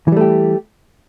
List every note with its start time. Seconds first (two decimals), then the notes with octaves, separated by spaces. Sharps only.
0.08 E3
0.12 G3
0.17 A3
0.21 G4